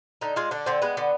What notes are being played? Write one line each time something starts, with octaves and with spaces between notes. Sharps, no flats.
D3 D#4
G#3 F4
D3 D4
D3 C4
G#3 B3
D3